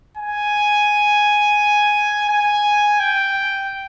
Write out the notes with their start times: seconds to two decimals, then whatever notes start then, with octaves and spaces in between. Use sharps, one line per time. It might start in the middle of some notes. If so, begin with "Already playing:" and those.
0.17 G#5
2.29 G#5
3.00 G5